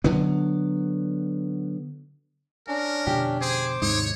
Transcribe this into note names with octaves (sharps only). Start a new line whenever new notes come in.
D3 F#3 B3
C#4 D4 A#4
F2 B2 D3 G4
G#4 C5 D6
D#2 G#2 C3 D#4 C#5